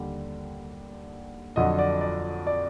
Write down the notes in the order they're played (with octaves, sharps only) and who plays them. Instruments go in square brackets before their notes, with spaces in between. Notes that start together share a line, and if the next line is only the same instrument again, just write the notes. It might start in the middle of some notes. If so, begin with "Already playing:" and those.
Already playing: [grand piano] D#2 D3 G3
F2 D3 F#3 D#5
D5
D5
D5